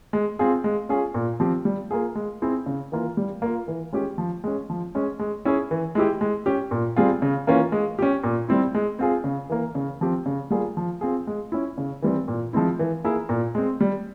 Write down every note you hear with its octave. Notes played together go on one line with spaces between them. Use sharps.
G#3
C4 F4 G#4
G#3
C#4 F4 G#4
A#2
F3 C4 G4
G3
A#3 F4 G#4
G#3
C4 E4 G#4
C#3
E3 A#3 F4
G3
A#3 F4
E3
G#3 C#4 G4
F3
G#3 C#4
F3
G#3 C#4
G#3
C#4 E4 G#4
E3
G#3 E4 G4
G#3
C#4 G4
A#2
G3 C4 F4 G#4
C#3
E3 A#3 C#4 F4
G#3
C#4 G4
A#2
G3 C4 E4
G#3
C4 F4 G#4
C#3
E3 A#3
C#3
F3 C4 G4
C#3
G3 A#3 F4 G#4
F3
C4 F4 G#4
G#3
C#4 E4
C#3
E3 G3 C4
A#2
F3 G#3 C4 E4
E3
A#3 E4 G#4
A#2
G#3 C4
G3